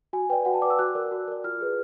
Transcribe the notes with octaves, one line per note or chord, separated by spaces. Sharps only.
F#4 G#5
B4 D5 G5
F#4 F#5
A5
B4 D5 D6
E6
F#4 F#6
A#4 D5
F#4
A#4 D5
F4 F6
G#4 B4